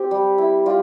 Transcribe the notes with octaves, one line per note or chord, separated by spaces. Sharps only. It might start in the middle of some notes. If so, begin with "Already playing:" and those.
Already playing: C4 G4
G3
E4
G3 F4